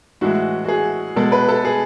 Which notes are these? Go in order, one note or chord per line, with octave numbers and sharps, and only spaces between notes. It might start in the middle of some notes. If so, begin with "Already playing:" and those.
A2 E3 G#3 F#4
F#4
G#4
B2 G#3 A4
B4
A4
G#4